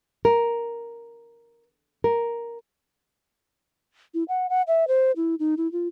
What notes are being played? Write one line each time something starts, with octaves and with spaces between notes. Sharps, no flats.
A#4
A#4
E4
F#5
F#5
E5
C5
E4
D#4
E4
F4